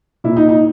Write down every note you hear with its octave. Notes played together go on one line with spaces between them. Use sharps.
A#2 E4
D#4
D#4